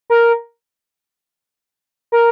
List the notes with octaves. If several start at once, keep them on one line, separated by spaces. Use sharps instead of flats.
A#4
A#4